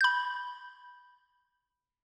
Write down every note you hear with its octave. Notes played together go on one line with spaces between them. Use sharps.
B5 G6